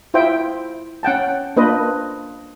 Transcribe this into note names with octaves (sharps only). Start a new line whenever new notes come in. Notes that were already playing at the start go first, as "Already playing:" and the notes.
E4 F4 C5 E5 G5
C#4 F#5 G5 A5
A#3 D4 F4 B4 C5 D#5